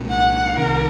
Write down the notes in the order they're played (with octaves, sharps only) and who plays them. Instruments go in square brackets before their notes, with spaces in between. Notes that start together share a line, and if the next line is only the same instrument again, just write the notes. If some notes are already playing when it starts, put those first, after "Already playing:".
Already playing: [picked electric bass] C2 A#2 G#3 C#4
[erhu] F#5
[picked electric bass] C2 C3 D#3 [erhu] A#4